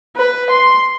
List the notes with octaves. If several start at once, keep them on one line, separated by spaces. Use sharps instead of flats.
B4
C6